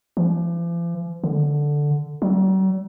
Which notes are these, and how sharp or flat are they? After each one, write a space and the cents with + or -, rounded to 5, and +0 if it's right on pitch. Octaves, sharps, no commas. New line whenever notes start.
F3 -45
D3 +0
F#3 +45